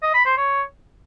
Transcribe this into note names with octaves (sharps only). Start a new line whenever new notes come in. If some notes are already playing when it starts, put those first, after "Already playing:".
D#5
B5
C5
C#5